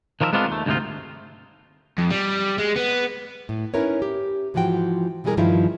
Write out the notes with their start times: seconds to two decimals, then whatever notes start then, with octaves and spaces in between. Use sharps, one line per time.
0.21 D#3 F3 A#4 D5 E5
0.33 G#3 B3 C4 D4 F4 A#4
0.48 D#2 A3
0.66 D2 G#2 C3 D#4 F4
1.98 F2
2.11 G3
2.59 G#3
2.77 B3
3.49 A2
3.74 C#4 D#4 E4 A#4 B4 C#5
4.02 G4
4.54 G#2 E3 F3 F#4 G5
5.24 B2 E3 G3 G#3 G#4 A#4
5.37 G2 D#3 F3 E4 F4